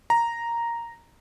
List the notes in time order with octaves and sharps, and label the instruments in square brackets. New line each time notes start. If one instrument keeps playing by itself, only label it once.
[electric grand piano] A#5